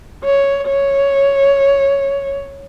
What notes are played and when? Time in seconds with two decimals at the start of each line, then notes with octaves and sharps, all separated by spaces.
0.24 C#5
0.68 C#5